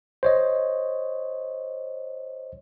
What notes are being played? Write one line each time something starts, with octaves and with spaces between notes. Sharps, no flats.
C5 C#5 D#5